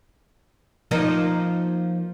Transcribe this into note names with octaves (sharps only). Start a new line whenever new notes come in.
F3 A#3 D#4